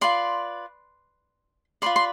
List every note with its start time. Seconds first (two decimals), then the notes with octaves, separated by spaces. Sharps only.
0.01 F4 B4 D5 C6
1.82 F4 B4 D5 C6
1.96 C6